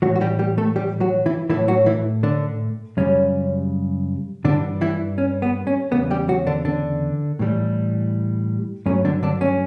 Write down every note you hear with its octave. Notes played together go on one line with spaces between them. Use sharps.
A2 E3 F#3 G3 F#4
F#4
G3 G4
G3 G4
A3 A4
G3 G4
F#3 F#4
E3 E4
A2 E3 F#3 A3 E4
F#3 F#4
E3 E4
D3 D4
F#2 C#3 G3 C#4
G2 D3 E3 G3 D4
E3 E4
C#4
B3
C#4
E2 C#3 G3 B3
G3 G4
F#3 F#4
D3 D4
D3 D4
A2 E3 G3
G2 F#3 A3 C#4
D3 D4
D3 D4
C#4